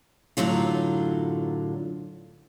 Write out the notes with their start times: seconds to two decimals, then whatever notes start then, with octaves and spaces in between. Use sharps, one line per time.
0.37 F#2 A2 D3 F#3 F4